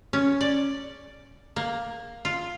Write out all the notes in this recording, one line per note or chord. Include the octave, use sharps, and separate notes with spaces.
C#4
D5
A#3
F4